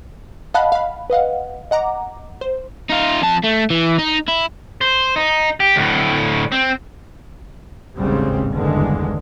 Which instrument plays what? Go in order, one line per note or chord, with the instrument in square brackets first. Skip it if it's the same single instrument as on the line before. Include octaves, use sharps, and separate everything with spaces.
[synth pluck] D#5 F5 F#5 A5 B5 F#6
F5 B5
B4 D#5 F5 F#5
D#5 F#5 A#5 D6
C5
[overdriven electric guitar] D#4 F4
F2 A5
A3
E3
D#4
E4
C5
D#4
G4
D2 A2
C4
[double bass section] A1 D#2 G#2 C#3 G3 C4
F#1 E2 G2 D3 D#3 G#3